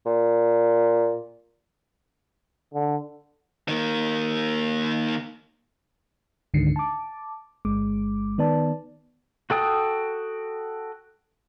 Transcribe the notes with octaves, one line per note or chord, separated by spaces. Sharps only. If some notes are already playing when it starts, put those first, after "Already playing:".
A#2
D3
D#3 A#3
C#2 G#2 D3 D#3 C7 C#7
A5 D6
G1 G#3 D6
D#3 B3 D5 A5
F#4 A4 G5 D#6